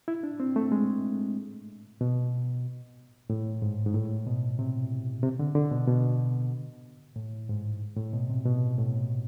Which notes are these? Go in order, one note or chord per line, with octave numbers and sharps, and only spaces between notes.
E4
D4
C4
A3
G#3
B2
A2
G#2
G#2
A2
B2
C3
C3
D3
D3
B2
B2
A2
G#2
A2
B2
C3
B2
A2